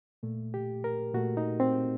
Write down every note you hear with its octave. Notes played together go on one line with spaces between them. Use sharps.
A#2 A3
G4
A#4
A#2 A3 F#4
D#4
C4